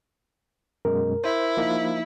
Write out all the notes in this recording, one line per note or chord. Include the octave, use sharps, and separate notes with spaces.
F#2 B2 G#3 A#4
E4 C5
F3 A#3 D#4